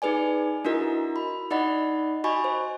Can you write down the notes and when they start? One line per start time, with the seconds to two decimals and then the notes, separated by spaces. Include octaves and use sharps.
0.02 D#4 G#4 B4 D5 G#5
0.65 D4 E4 F#4 A#4 D#5
1.16 B5
1.51 D#4 D5 D#5 F#5 B5
2.24 F#4 D#5 G#5 B5 C#6
2.44 C5